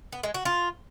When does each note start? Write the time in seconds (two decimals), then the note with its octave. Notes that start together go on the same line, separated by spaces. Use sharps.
0.12 B3
0.23 G#3
0.34 F#4
0.45 F4